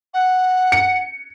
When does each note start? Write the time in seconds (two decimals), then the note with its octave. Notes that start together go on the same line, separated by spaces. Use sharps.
0.14 F#5
0.72 C#7